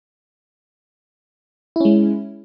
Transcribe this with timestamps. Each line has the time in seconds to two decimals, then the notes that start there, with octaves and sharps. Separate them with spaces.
1.76 E4
1.80 C#4
1.85 G#3